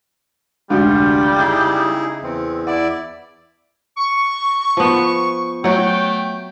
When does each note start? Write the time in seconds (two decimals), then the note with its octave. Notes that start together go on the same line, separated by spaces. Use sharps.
0.70 F1 D2 D3 G3 G#3 F4 F#4
1.37 C#3 D#4 E4 G#4
2.23 E2 C4
2.67 E4 D5 F#5
3.98 C#6
4.77 F3 B3
5.64 F#3 A3 F#4 G5